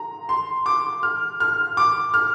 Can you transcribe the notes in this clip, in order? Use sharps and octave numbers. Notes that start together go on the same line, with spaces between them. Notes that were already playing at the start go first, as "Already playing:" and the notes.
Already playing: A#5
C6
D6
F6
F6
D6
F6